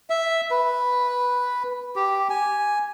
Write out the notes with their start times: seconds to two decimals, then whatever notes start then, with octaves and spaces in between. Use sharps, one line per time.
0.10 E5
0.51 B4
1.96 G4
2.30 G#5